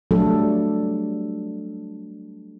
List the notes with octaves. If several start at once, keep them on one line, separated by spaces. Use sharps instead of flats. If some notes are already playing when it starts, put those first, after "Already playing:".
F#3 G3 A3 D4 F#4 A4